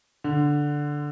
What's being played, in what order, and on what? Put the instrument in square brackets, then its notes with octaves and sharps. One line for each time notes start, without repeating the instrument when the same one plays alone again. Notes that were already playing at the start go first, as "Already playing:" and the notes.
[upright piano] D3